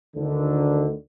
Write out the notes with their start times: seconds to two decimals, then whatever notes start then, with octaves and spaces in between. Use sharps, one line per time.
0.16 D2 D3 D#3